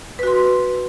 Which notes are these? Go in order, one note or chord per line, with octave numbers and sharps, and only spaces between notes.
F#4 B4 C6